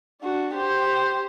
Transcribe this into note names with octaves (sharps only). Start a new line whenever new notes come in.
D4 F#4
G4 C5